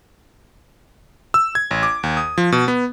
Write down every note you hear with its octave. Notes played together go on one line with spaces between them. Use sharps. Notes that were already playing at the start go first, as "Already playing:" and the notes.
E6
G#6
A1
D6
D#2
D#6
F3
B2
B3